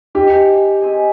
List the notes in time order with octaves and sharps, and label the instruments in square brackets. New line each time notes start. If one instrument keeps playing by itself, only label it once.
[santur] C4 D#4 G#4 D#5 [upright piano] G4
[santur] C4 D#4 G#4 D#5